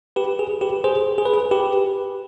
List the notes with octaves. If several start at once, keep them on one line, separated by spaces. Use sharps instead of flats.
G4 B4
G#4
G4 B4
G#4 C5
G#4
B4
G#4
G4 B4